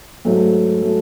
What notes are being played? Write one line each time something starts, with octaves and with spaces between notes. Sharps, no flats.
G#2 F#3 A3
F#3 A3